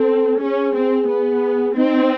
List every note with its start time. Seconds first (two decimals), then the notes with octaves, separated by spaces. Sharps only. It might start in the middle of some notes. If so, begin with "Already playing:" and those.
Already playing: C4 A4
0.41 C#4 G#4
0.75 C4
1.08 B3
1.76 C4 D#4